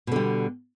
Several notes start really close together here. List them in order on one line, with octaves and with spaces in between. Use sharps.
B2 D3 G3